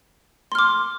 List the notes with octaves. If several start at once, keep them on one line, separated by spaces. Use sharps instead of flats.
C6 D6 F6